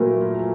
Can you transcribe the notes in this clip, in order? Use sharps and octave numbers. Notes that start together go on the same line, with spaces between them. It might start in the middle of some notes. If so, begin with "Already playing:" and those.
Already playing: A#2 F#3 A3 A#4 B4